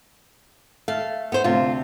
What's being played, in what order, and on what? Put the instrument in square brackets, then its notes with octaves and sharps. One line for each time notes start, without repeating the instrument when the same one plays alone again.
[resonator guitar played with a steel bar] A3 [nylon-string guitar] F5
[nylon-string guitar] B3 C5
[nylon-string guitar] D2 C3 [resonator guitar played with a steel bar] F4